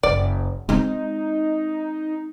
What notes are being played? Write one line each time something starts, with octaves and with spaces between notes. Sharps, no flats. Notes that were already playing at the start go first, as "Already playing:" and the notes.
F#1 D5
G#3 C4 D#4